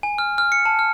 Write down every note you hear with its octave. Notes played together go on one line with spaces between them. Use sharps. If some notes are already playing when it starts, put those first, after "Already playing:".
G#5
F6
F6
C#7
A5
F6